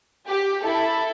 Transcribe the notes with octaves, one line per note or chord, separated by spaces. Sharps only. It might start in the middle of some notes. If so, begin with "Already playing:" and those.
G4
E4 A4